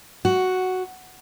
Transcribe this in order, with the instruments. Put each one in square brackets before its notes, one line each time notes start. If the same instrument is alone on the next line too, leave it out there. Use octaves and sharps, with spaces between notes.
[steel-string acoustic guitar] F#4